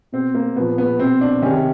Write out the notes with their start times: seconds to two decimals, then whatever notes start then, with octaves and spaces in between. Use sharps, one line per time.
0.12 B2 C4
0.35 A#3
0.56 A#2 F3 B3
0.78 B3
0.99 B2 C4
1.21 D4
1.42 C3 D#3 C#4